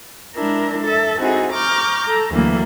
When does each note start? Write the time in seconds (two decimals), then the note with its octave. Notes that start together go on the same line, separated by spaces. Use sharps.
0.35 G#3 D4 E4 A#4
0.82 A4 E5
1.18 C4 D#4 E4 F#4 G#4
1.51 A#5 C#6 D6 F6 G6
2.03 A4 A#5
2.33 D2 E3 F#3 A3 A#3